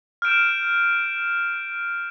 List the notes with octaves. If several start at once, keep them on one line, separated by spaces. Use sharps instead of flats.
F6 G6 D7 E7